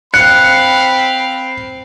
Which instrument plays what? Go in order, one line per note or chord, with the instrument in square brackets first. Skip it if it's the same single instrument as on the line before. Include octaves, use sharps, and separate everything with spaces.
[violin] C4 F5 [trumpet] B5 [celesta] F#6 [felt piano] C#7